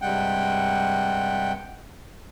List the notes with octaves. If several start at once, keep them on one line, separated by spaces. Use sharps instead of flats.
G2 C3 G3 G#3 F#5 G5